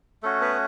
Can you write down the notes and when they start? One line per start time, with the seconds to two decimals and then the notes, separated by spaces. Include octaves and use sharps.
0.23 A3 C#4 F#4 A4
0.41 B3 B4